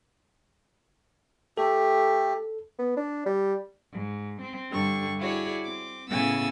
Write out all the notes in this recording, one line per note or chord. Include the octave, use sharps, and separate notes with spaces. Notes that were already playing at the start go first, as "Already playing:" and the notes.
A3 G4 A4
B3
D4
G3
G#2
C4
G2 D3 G3 C#6
E4 F#4 G#4 C#5 D5
C4 D6
A2 C#3 B3 G#5 E6 A6